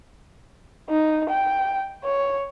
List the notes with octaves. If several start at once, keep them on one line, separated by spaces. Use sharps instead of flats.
D#4
G5
C#5